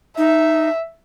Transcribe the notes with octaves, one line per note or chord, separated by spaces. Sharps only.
D#4 E5